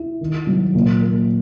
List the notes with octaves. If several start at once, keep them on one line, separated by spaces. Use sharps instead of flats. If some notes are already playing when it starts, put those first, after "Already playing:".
Already playing: E4
D#3
F#3
A#2
A#3